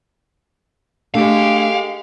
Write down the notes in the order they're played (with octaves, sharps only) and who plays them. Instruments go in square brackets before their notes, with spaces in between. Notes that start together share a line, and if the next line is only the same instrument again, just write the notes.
[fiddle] G#3 G4 [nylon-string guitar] A3 D4 [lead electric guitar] F5